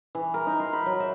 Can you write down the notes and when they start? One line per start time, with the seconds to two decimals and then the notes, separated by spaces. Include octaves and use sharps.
0.15 E3
0.34 A#4
0.47 D#4
0.60 C6
0.73 B5
0.86 F#3
1.00 E5